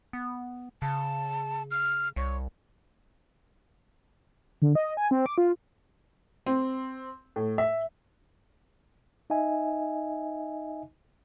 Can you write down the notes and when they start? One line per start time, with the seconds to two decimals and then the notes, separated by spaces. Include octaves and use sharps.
0.13 B3
0.82 C#3 A5
1.71 F6
2.16 C2 C#5
4.62 D3
4.75 D#5
4.97 G#5
5.11 C4
5.26 D6
5.38 F4
6.46 C4
7.36 A2
7.58 E5
9.30 D#4 D#5 E5 G#5